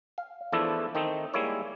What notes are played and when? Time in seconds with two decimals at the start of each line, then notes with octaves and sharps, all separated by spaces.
0.18 F5
0.52 E2 F3 A3 D4 E4 A4
0.95 D#3 A3 C4 D#4
1.34 G3 G#3 A#3 E4 C#5